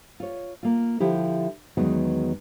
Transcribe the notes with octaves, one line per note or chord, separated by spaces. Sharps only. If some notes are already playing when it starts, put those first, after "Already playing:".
F4 C#5
A#3 F4
D3 F3 E4 G4
E2 D#3 F#3 G#3 B3 F#4